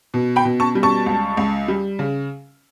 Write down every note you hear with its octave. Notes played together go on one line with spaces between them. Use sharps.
B2
G5 B5
B2
A5 C#6
G3
A5 C#6
C#2
C#2
G3
C#3